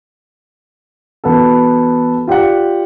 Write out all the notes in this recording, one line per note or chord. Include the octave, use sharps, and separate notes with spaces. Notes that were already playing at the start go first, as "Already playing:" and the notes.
E3 B3 F#4 A4
F4 G4 D5 F#5